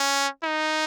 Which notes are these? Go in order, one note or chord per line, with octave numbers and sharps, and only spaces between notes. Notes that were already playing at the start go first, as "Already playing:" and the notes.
Already playing: C#4
D#4